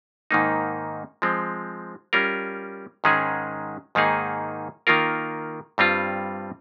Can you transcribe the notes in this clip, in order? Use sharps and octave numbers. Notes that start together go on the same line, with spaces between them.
G#2 D#3 A#3 D#4
F3 G#3 C4
G3 C#4 F4 A#4
G#2 D#3 G#3 C#4 G#4
G#2 D#3 A#3 D#4 G#4
D#3 A#3 F4 A#4
G2 G3 C4 F4